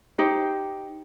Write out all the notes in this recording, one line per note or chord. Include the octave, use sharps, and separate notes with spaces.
D#4 G4 C5